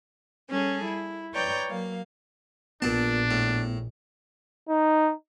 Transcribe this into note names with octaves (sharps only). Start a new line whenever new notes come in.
G3 C#4 G#4 A4
E4
B4 C#5 D5 G5 A#5 G6
F#3 A#3 F5
A#1 A#2 B3 D4 A5
A2
D#4